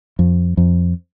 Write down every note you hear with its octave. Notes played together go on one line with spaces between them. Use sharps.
F2
F2